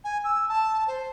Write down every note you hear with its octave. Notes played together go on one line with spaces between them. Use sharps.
G#5
E6
A5
C5